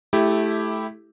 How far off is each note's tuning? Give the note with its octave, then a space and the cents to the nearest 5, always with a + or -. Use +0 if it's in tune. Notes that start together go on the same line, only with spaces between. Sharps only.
A3 -20 E4 +0 G4 +0